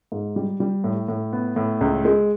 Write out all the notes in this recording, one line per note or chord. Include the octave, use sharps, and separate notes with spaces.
G#2
G3
G3
A2
A2
B3
A2
C#2
G#3